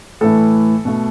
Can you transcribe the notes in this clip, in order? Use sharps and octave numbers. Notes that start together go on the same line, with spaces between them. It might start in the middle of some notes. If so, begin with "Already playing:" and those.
A2 E3 A3 A4
B2 A3